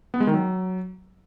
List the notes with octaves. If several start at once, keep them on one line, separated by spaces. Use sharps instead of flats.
B3
G#3
D#3
F#3